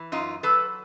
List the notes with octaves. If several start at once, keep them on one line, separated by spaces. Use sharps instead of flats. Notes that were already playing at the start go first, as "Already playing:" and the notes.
Already playing: E3
F#2 D#4 F4
F#3 A4 B4